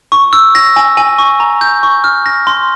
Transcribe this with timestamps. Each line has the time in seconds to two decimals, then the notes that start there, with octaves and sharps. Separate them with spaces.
0.12 C#6
0.33 E6
0.55 A#6
0.76 G#5
0.97 G#5
1.18 C#6
1.40 A#5
1.61 G6
1.83 C#6
2.04 F6
2.26 A#6
2.47 C6